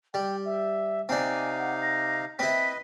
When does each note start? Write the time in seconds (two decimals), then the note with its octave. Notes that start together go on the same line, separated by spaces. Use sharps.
0.14 G3 G5
0.45 E5
1.09 C3 C4 D4 D#4 F5 G#5
1.59 F#5
1.82 A#6
2.39 C4 E4 B4 D#5 B6